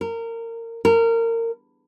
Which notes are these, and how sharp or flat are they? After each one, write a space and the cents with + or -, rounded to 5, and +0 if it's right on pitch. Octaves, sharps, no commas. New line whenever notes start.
A#4 -25
A#4 -25